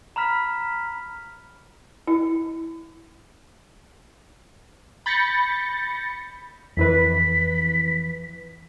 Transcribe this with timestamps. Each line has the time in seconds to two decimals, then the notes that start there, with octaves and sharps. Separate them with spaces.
0.16 A#5 B5 F6 B6
2.07 E4
5.06 B5 G6 A6 A#6 C#7
6.77 F2 E3 B4 B6